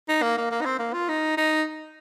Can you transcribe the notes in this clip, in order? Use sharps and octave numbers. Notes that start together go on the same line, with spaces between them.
D#4
A#3
A#3
A#3
D#4
C4
A#3
F4
D#4
D#4